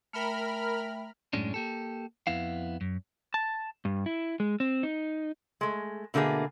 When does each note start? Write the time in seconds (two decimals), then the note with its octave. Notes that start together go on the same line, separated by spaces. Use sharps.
0.13 A3 A#4 E5 G5 B5 F6
1.33 F#2 A2 G#3 C#4 D4
1.54 A#3 G4 A4
2.27 F2 B3 E4 F5
2.81 F#2
3.34 A5
3.85 G2
4.06 E4
4.40 G#3
4.60 C4
4.83 D#4
5.61 G#3 A3
6.14 B2 D3 A3 A#3 G#4